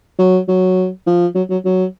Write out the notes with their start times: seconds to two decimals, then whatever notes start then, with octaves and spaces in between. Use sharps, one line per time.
0.19 F#3
0.48 F#3
1.06 F3
1.35 F#3
1.50 F#3
1.65 F#3